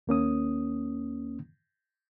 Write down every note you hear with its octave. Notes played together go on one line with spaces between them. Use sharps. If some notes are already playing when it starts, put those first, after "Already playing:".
D#2 A#3 C#4 D#6